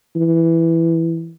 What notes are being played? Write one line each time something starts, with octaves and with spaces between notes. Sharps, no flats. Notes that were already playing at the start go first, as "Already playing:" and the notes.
E3